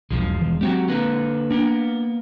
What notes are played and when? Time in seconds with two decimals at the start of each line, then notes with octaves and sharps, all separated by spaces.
0.10 E1 B1 F3 G#3
0.41 E1 E3
0.61 F#3 G#3 C4 F#4 G4
0.88 D3 A#3 B4
1.51 A#3 B3 D4